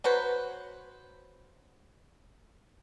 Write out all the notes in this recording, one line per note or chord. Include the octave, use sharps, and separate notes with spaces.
F#3 F#4 B4 C5